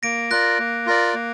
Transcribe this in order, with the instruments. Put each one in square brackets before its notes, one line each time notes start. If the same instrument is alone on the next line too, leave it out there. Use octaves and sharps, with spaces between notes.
[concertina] A#3 [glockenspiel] A#6 D7
[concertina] F4 A#4 D5 [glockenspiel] F#6 A#6
[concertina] A#3
F4 A#4 D5
A#3